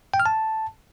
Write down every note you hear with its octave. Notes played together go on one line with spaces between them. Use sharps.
G5
F6
A5